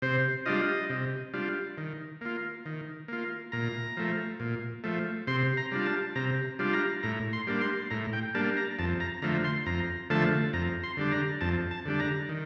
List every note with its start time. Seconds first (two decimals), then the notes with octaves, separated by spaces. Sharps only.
0.02 C3 C5
0.46 G3 D4 F4 D#5
0.90 C3
1.33 G3 D4 F4
1.78 D#3
2.21 A#3 F4
2.66 D#3
3.08 A#3 F4
3.52 A#2 A#5
3.97 F3 A3
4.40 A#2
4.84 F3 A3
5.27 C3 C6
5.57 A#5
5.72 G3 D4 F4
5.86 A5
6.15 C3 A#5
6.59 G3 D4 F4
6.73 A#5
7.03 A2 A#5
7.33 C6
7.47 G3 A#3 D4
7.61 C6
7.91 A2 A#5
8.13 G5
8.35 G3 A#3 D4 A5
8.57 A#5
8.79 F2 A5
9.00 A#5
9.22 D3 F3 A3 A#5
9.44 C6
9.66 F2 A#5
10.10 D3 F3 A3 A5
10.53 F2 A#5
10.84 C6
10.97 D3 G3 D4
11.12 A#5
11.41 F2 A5
11.71 A5
11.86 D3 G3 D4
12.00 A#5
12.29 D#3